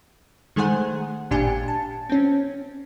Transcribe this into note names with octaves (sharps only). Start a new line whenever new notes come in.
D#3 G#3 A3 G#4 C5 F#5
G#1 A#2 D4 G4 G#5 C#7
A5
C4 C#4